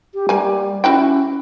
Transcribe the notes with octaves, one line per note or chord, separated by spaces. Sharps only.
G4
G3 A#3 G#5
C#4 E4 F#4 G5